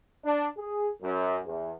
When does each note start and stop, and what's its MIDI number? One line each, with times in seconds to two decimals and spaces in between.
0.24 0.47 62
0.57 0.88 68
1.01 1.38 42
1.46 1.72 40